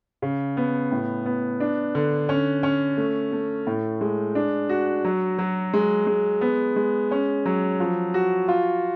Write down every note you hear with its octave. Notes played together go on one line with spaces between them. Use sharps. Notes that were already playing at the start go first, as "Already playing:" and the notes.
C#3
B3
A2
B3
D4
D3
C#4
C#4
A3
A3
A2
G#3
D4
F#4
F#3
F#3
G#3
G#3
B3
G#3
C#4
F#3
F3
F#4
F4